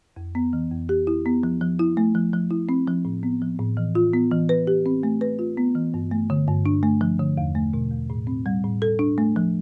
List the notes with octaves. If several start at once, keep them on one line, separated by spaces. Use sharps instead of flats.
F2
B3
E3
F2
G4
E4
B3
F3
F3
E4
A3
F3
F3
E4
C4
F3
A2
B3
F3
A2
E3
F4
B3
E3
B4
G4
C4
A3
B4
F4
B3
E3
G2
A3
D3
G2
D4
A3
F3
D3
E2
A3
B2
E2
A2
C4
G3
A2
A4
D4
A3
F3